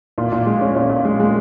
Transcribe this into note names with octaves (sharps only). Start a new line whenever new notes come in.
A#2
A#2
G#3
C#4
A#2
A#2
G#3
G#3